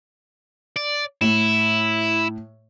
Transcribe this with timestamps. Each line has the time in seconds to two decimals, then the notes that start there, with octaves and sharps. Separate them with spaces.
0.76 D5
1.22 A2 E4